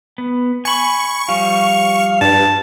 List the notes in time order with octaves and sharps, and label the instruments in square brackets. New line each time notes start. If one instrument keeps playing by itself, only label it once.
[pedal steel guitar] B3
[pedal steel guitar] G#5 B5 [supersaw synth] C#6
[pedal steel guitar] F3 G3 [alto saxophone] F5
[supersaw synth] G2 [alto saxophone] A5